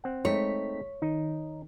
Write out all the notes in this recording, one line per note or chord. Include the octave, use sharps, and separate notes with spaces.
C4 F#5
G#3 A3 C4 D#4 C#5 B6
D#3 D#4